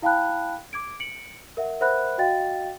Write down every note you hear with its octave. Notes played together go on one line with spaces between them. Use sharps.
E4 F5 G5 A5 B5 F#6
D6 G#6 D7
C#7 D7 F#7
A#4 E5 F#5
A#4 C5 E5 F#5 B5 F#6
F#4 D#5 F5 G5 A6